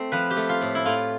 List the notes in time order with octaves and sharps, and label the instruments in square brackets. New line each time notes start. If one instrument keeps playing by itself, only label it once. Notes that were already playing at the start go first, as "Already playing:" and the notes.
Already playing: [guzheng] A3 C4
F3 B4
G4
A3
F4
A2
E4
A2 F4